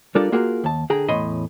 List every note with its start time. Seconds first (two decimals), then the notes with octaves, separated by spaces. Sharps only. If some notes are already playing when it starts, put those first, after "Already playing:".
0.15 G3 D4 F4 A4 A#4 D5
0.32 A#3 F4 F#4 G#4 A#4
0.64 D#2 A5
0.90 D3 G#4 G5 A#5
1.08 E2 A2 C#5 D#5 B5 C6